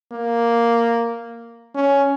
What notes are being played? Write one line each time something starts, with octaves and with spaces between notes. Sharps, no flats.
A#3
C#4